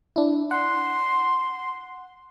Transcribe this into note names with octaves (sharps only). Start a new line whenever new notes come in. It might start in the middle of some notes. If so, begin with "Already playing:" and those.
D4 E4
F#5 C6